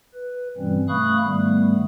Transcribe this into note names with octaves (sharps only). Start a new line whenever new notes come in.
B4
G2 B2 E3 G3 C4 C#4
A3 F5 B5 C#6 D#6 F#6
G#2 D#3 G3 A3 B3